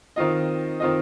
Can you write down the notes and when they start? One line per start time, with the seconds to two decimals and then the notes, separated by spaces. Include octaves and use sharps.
0.16 D#3 C4 F4 D#5
0.80 D#3 C4 F4 D#5